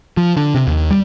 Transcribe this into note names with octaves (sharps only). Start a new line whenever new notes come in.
F3
D3
C3
D#2
G3